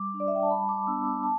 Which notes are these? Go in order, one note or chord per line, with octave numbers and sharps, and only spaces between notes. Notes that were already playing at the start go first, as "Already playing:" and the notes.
Already playing: G3 D6
D4
D5
E5
G5
A5
G3 B5
D6
B3 D4 E6
D6
A5